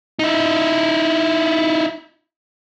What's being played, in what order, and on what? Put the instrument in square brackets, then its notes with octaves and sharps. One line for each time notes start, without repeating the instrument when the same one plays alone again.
[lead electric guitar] D#4 E4